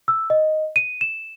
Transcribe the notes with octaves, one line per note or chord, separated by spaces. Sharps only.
E6
D#5
D#7
E7